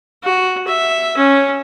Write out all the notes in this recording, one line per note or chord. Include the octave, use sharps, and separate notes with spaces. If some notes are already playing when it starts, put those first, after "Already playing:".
F#4
E5
C#4